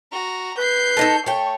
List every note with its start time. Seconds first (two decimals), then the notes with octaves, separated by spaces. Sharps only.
0.12 F#4 A#5
0.58 B4 G6 C7
0.97 A3 D#4 A4
1.26 A3 C#5 G5